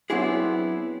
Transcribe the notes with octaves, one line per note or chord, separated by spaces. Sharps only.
F#3 B3 C4 D4 E4 G#4